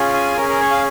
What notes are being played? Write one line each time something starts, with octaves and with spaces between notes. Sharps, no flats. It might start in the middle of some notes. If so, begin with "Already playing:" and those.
Already playing: C#4 F4 G#4
G#5
C#4 G#4 A#4
A#4
C#5
F5